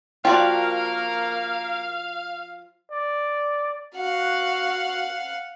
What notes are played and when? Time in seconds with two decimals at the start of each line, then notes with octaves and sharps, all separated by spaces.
0.25 F3 A#3 F#4 A#4 D5 F5 G5
2.91 D5
3.95 F#4 F5 F#5